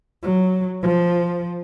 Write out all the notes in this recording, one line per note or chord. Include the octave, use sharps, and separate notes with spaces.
F#3
F3